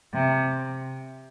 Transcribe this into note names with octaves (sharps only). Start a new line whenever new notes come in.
C3